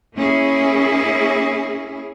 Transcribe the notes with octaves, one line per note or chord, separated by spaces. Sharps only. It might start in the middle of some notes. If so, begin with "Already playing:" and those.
A#3 C#4 E4 G#4